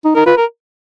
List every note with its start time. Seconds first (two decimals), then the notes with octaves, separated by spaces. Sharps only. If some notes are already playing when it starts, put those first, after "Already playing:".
0.05 D#4
0.15 D#4 A#4
0.26 F4 B4
0.37 A#4